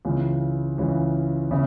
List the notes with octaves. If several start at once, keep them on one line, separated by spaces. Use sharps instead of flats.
C#2 C#3 E3
C#2 C#3 E3
C#3 E4